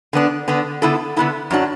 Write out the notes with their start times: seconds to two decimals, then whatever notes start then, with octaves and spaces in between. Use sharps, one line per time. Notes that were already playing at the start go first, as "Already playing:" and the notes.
0.13 D3 B3 D4
0.48 D3 B3 D4
0.82 D3 B3 E4 A4
1.16 D3 B3 E4 A4
1.51 F#2 F#3 D4 F#4